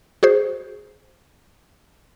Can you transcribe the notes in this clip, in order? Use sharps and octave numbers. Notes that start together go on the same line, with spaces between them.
F#4 G#4 C5